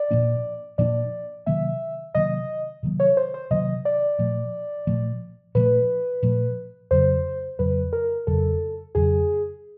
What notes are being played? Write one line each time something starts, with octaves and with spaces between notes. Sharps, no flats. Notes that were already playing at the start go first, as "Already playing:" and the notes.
Already playing: D5
A#2 F3 A#3 D4
A#2 F3 A#3 D4 D5
C3 D#3 F#3 A#3 E5
C3 D#3 F#3 A#3 D#5
C3 D#3 F#3 A#3
C#5
C5
C5
C3 D#3 F#3 A#3 D#5
D5
A#2 F3 A3
A#2 F3 A3
A#2 F3 A3 B4
A#2 F3 A3
F2 C#3 F#3 C5
F2 C#3 F#3 B4
A#4
F2 C#3 F#3 A4
F2 C#3 F#3 G#4